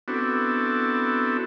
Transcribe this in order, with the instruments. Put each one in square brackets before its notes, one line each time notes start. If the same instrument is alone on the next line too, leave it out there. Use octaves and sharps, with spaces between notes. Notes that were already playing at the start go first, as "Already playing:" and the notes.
[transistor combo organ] B3 C4 D4 E4 F#4 A4